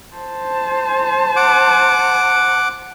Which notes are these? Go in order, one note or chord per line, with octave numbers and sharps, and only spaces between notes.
C5 A5
F#5 D6